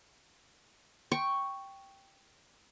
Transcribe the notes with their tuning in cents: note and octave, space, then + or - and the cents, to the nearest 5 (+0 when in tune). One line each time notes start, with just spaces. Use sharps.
G5 +0 C#6 +0